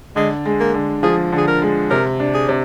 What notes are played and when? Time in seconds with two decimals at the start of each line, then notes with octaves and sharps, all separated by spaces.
0.16 D3 G#3
0.46 G#3
0.60 A#3
0.74 D3
1.03 F3 G#4
1.32 D3
1.38 G#4
1.48 A#4
1.62 G#3
1.90 C3 A#4
2.20 D4
2.34 G#4
2.49 C3